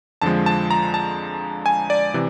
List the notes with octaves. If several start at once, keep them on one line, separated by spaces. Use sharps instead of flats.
F2 D3 F3 G#3 A5
A5
A#5
A5
G#5
D5
C3 E3